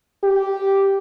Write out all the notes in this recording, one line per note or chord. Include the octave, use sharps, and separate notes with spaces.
G4